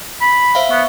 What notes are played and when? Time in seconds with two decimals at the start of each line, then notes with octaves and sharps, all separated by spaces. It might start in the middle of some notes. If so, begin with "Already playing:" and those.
0.21 B5
0.55 C5 E5 F5
0.71 B3 C#6